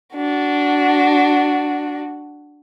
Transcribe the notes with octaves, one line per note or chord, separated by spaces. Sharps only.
D4 F#4